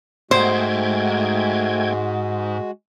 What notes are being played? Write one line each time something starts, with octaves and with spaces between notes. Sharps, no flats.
G#2 G#3 A3 F#4 C5 G5 G#6